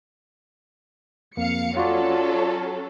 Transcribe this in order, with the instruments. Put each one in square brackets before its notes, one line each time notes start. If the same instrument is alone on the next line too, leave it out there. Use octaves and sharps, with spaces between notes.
[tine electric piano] F2 A#3 [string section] F5 C#7
[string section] F#3 C#4 A4 [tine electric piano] F4 F#4 D5